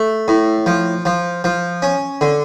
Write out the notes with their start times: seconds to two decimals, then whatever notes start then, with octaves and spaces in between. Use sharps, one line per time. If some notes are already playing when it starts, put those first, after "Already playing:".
Already playing: A3
0.28 A2
0.66 F3
1.05 F3
1.44 F3
1.82 C#4
2.21 D3